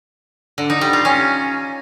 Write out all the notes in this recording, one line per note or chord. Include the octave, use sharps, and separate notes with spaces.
D3
D#4
G3
F4
C#4